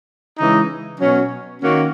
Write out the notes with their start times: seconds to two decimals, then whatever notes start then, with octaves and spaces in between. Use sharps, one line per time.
0.39 C#3 E3 G#3 D#4
1.00 B2 F#3 C#4
1.62 D#3 A#3 C#4 F#4